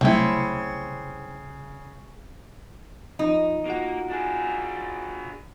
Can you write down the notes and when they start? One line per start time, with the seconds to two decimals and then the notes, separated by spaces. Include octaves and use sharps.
0.01 C2 C#3 F#3 A3 C4 E4
3.19 F3 D#4 F4
3.66 A#3 F4 F#4 F#5
4.10 D4 G#4